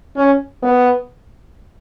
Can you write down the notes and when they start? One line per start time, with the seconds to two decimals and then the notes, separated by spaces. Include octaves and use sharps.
0.16 C#4
0.63 B3